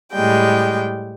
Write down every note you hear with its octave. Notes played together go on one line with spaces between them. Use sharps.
A2 G3 G#3 G5